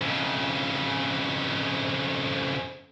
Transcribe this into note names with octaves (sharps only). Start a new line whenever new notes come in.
F2 C#3